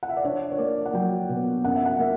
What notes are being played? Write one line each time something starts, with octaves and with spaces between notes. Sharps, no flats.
F#5
E5
D5
D4 C#5
C#5
A#3 D5
F#5
F#3 G5
B2
F#2 F#5
E5
F#5
A#3 E5